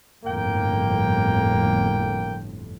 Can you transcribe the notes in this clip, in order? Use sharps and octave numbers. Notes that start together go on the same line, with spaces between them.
G1 F2 A2 A#3 G5